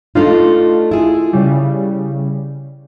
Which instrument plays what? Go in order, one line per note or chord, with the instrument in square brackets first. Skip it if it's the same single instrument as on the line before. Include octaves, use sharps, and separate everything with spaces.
[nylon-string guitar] A3 D4 D#4 [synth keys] F4
[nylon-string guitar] E4 G#4
[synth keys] C#3 G3